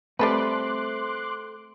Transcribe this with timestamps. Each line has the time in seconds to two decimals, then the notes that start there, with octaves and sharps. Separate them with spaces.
0.19 G3 A3 C4 A4 B4 C6 D6 F#6